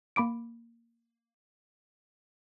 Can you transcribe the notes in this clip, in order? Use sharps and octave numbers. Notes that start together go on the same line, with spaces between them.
A#3 B5 D6 D7